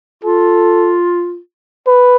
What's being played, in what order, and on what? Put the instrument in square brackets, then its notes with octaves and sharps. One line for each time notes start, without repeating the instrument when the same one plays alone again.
[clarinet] F4 [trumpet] A4
[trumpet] B4